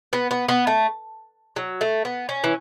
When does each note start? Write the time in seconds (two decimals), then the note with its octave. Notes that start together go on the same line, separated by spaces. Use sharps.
0.13 B3
0.31 B3
0.49 B3
0.67 A3
1.56 F#3
1.81 A3
2.05 B3
2.29 C#4
2.44 E3